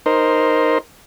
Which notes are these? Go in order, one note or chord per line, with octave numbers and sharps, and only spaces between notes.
D#4 A#4 C5